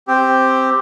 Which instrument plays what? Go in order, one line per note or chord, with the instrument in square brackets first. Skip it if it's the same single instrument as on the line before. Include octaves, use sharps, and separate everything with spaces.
[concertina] C4 G4